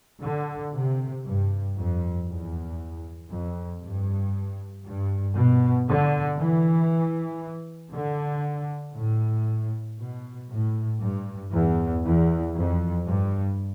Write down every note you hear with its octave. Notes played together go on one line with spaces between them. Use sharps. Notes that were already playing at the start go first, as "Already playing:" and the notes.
D3
C3
G2
F2
E2
F2
G2
G2
B2
D3
E3
D3
A2
B2
A2
G2
E2
E2
F2
G2